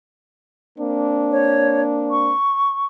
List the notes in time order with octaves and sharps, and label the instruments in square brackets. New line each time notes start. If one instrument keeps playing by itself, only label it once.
[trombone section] A#3 C4 D4
[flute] C#5
C#6